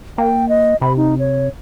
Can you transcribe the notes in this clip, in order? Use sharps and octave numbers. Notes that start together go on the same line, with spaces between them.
A#3 G5
D#5
C3 B5
D#4
C#5